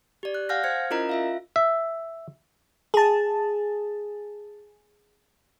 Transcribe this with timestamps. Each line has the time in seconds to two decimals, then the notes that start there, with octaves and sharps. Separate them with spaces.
0.23 G4 D5
0.35 F#6
0.49 F5 F#5 G#5 F6 G6 A#6
0.64 C5 F6 G#6 C#7
0.90 C#4 E4 F4 A#4 D#5 A#5
1.09 F4 E5 F5
1.56 E5
2.94 G#4 A5